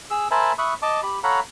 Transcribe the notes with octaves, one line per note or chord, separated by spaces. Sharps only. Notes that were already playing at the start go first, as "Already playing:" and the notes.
G#4 E6
A#4 C5 E5 G#5 A5 B5
E5 B5 C#6 D#6 F#6
D#5 A5 D6
G4 B5
A4 C#5 F5 F#5 A#5 B5